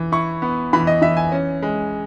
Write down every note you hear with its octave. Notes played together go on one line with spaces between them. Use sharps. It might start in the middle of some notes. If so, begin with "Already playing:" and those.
Already playing: E3
E4 C#6
B3
E3 B5
D#5
E3 E5
G#5
C#4
G#3